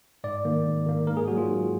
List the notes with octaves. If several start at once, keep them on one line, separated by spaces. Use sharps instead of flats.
G#2 D5
D#3 A#3
G#2
D#3 A#3
G#2 A#4
G#4
F#3 A#3 F#4
F4
G#2